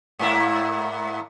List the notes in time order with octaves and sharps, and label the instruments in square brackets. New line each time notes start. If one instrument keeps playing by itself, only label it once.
[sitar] G#2 A#3 E4